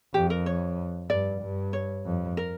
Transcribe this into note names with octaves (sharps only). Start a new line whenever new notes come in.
F2 G4
A#4
C#5
G2 D5
G2
C#5
F2
A#4